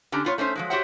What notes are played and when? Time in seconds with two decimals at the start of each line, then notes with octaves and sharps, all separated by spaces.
0.12 D3 C#4 D4 G4 A#5
0.24 B3 F4 C#5
0.38 A3 C#4 D#4 C5
0.55 F3 F#3 G#3
0.70 F#4 G4 C5 C#5 E5 F#5